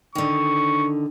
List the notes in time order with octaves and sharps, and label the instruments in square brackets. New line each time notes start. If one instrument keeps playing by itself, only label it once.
[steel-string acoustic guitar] D3 D#3 [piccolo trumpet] C#6